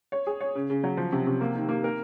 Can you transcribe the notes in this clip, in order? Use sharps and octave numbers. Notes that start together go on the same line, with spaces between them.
C#5
G#4
C#5
C#3
C#3
F#3
F3
C3
C3
A#3
D#3
A#3
A#4